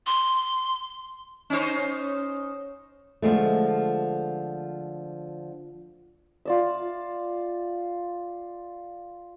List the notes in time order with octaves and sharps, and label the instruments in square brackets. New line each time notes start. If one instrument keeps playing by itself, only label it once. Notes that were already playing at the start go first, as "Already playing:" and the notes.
[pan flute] C6
[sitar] C#4 D#4 C5
[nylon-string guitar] D3 F3 G#3 A3
[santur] F4 D5 E5